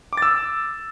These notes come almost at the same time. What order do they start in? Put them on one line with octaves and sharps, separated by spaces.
D6 A6 E6